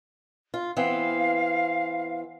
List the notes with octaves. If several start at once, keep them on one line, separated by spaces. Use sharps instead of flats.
F4
E3 B3 C4 F5